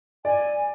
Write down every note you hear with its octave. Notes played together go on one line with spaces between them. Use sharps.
D5 G#5